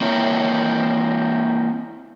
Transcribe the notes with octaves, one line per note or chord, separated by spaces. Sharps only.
A#3 C4 E4 A#4 C#5